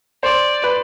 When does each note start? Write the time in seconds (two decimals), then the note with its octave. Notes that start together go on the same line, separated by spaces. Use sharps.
0.23 C5 D5
0.64 B4